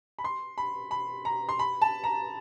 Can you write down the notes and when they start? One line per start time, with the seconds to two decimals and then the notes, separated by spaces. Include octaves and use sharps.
0.19 B5
0.24 C6
0.58 B5
0.91 B5
1.25 A#5
1.49 C6
1.59 B5
1.82 A5
2.04 A#5